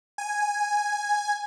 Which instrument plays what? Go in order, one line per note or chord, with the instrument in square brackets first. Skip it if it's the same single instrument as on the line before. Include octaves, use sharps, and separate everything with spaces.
[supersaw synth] G#5